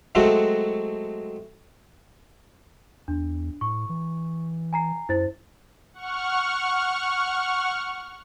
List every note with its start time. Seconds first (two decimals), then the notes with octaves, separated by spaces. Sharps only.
0.15 F#3 G#3 A3 C4 F#4
3.08 E2 D4
3.61 A2 C#6
3.89 E3
4.73 G#5 A#5 C7
5.09 F#2 E4 C5 A6
5.93 F#5 C#6 F6